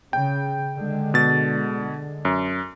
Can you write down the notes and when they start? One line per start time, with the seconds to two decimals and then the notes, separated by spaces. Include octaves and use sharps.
0.13 C#3 G5
0.76 D3 G#3
1.14 B2 A6
2.25 F#2